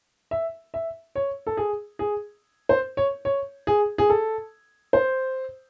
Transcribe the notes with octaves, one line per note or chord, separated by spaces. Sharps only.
E5
E5
C#5
A4
G#4
G#4
C5
C#5
C#5
G#4
G#4
A4
C5